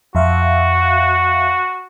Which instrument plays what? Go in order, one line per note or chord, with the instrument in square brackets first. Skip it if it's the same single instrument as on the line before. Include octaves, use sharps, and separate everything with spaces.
[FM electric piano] F2 E5 F5 [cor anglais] F#4